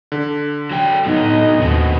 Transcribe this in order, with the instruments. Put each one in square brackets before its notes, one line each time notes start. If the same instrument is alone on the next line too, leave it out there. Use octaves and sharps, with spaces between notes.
[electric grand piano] D3
[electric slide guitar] F#3 G5
[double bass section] A2 [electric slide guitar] F#3 B3 D#4 [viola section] D#5
[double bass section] D#2 [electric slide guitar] B2 C#4 F#4